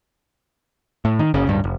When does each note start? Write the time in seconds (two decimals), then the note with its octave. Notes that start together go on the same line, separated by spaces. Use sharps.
1.05 A2
1.19 D#3
1.34 F#1 C#3
1.47 D1 G2
1.64 F1